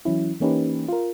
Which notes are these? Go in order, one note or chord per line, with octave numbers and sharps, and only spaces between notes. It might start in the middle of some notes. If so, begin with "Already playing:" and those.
E3 F#3 C#4 E4
E3 A#3 C#4 D#4 G4 B4
F4 A#4